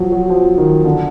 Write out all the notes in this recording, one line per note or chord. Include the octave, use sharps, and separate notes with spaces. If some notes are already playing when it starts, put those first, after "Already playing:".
Already playing: F3 F#3
F#3
F3
D#3
D3